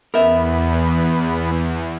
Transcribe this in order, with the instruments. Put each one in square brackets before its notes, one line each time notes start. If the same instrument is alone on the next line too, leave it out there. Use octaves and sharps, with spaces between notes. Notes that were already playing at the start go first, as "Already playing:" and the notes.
[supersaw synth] E2 [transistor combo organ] B3 [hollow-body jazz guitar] A#4 E5